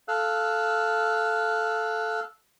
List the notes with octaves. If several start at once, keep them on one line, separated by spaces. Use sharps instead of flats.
A4 F5 E6 F#6